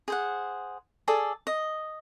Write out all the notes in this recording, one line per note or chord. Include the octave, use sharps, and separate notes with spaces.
G#4 C5 F#5
G#4 A4 D5
D#5